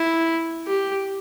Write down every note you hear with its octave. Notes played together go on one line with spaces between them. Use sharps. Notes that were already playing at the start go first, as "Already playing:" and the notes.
Already playing: E4
G4